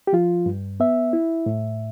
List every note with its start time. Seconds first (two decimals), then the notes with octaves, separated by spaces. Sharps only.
0.07 G4
0.13 F3 F4
0.46 G2
0.80 B3 E5
1.13 E4
1.46 A2